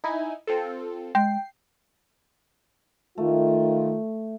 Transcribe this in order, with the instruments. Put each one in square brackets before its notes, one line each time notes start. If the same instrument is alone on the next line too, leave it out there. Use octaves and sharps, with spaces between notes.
[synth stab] D#4 E4 G#5
C4 F4 A4
[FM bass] G#3 [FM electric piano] G5 [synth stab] C7
[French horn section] D#3 F4 [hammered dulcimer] A3